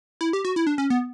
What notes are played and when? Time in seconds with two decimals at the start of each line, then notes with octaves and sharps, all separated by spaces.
0.21 E4
0.33 G4
0.45 F#4
0.56 E4
0.67 D4
0.78 C#4
0.90 B3